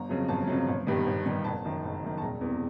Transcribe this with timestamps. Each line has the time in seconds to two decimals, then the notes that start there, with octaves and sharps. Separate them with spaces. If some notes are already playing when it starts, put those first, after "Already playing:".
Already playing: G1 A#5
0.09 F2 C#3 F#3
0.28 G1 A5
0.48 F2 C#3 F#3
0.68 G1
0.87 G2 D#3 G3 B3
1.06 G1
1.26 G2 D#3 G3 B3
1.44 F#1 A5
1.65 F#2 D#3
1.84 F#1
2.03 F#2 D#3
2.18 A5
2.22 E1 A#5
2.41 E2 C3